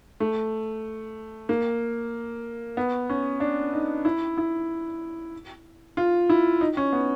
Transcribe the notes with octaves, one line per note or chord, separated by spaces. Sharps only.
A3
A#3
B3
C#4
D4
D#4
E4
E4
F4
E4
D#4
C#4
B3